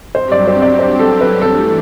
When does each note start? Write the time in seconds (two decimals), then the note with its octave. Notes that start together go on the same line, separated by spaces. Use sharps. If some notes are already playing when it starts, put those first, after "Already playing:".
0.15 G2 F#3 C4 G4 C5
0.32 D5
0.47 C5
0.62 D5
0.79 C5
0.99 A4
1.21 B4
1.42 E3 A3 D4 A4